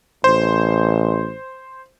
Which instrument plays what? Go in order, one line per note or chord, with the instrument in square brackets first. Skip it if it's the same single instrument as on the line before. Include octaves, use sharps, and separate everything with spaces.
[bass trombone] A1 [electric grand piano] C5